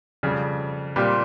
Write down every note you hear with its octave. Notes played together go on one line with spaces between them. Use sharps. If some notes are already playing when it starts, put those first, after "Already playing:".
F2 C#3 G3
A#2 G3 C4 G4